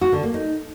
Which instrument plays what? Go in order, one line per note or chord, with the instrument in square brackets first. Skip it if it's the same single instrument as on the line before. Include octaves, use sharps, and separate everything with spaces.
[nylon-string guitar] F#4
D3
A#3
D#4